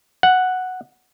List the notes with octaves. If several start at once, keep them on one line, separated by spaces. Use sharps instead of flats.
F#5